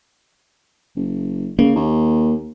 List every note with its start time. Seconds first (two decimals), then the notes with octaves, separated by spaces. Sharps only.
0.96 F#1
1.59 C#3 A#3
1.75 D#2